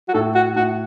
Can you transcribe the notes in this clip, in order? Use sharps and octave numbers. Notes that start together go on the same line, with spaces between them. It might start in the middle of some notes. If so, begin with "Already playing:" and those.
F#4
A2 A4
F#4
A2 F#4